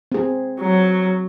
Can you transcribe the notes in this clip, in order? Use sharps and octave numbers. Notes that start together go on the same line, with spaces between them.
C4 G#4
F#3